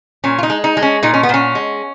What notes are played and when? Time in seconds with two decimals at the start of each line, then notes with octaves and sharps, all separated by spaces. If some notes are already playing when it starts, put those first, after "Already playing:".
0.24 A#2 C#4
0.38 F4
0.43 D#4
0.50 G#3
0.64 D#4
0.77 G#3
0.82 C#4
1.03 A#2 D#4
1.14 C#4
1.23 B3
1.29 A#2 C#4
1.55 G#3